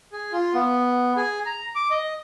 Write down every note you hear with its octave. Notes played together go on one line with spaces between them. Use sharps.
G#4
F4
B3
G#4
A#5
D6
D#5